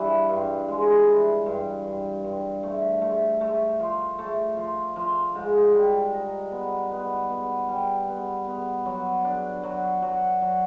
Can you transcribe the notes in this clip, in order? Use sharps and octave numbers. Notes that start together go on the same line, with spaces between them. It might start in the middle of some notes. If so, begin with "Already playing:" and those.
Already playing: G2 E3
G2
G#3
E3
G2
G2
G2
A3
A3
A3
F3
A3
F3
F3
G#2
G3
D#4
B3
B3
B3
G3
B3
B3
F#3
D4
F#3
F#3
F#3